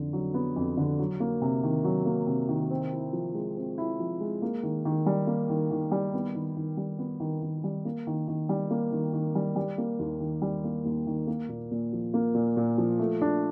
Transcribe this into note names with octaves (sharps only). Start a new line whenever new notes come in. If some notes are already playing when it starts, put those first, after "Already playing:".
Already playing: F2 D3
F#3
B3
F2
D3
F#3
A#3
C3
D#3
F#3
A#3
C3
D#3
C4
E4
F3
G#3
C4
E4
F3
G#3
A#3
D#3
D#3
G3
A#3
D#3
D#3
G3
B3
D#3
D#3
G3
B3
D#3
D#3
G3
A#3
D#3
D#3
G3
A#3
D#3
D#3
G3
G3
A#3
D#2
D#3
G3
A#3
D#2
D#3
A#3
A#2
A#2
F3
A#3
A#2
A#2
F3
A3
D4